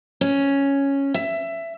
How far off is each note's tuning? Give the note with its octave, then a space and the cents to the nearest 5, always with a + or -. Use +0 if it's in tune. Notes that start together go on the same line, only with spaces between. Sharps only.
C#4 +0
E5 +15